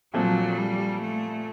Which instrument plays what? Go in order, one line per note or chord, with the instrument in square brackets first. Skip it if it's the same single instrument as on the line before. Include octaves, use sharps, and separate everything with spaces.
[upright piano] A#2 F3 A3 C4 [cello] F#3
[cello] G3
A3